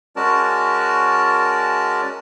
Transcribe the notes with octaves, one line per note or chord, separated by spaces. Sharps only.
G#3 C#4 F#4 A#4 D5 A5